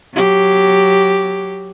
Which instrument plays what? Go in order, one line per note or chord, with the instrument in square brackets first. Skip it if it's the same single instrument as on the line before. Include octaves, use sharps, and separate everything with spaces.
[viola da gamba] F#3 G4